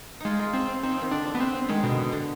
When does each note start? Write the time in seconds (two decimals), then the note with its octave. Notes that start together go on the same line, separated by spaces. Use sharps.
0.20 G#3 D#4 F4
0.40 F4
0.54 C4
0.83 C4 D#4
0.92 F3
1.02 D#3
1.11 D3 D4
1.35 B3
1.40 C4
1.69 D#3 G#3
1.83 B2 D3
2.12 D3